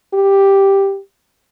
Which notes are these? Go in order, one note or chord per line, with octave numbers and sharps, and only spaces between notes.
G4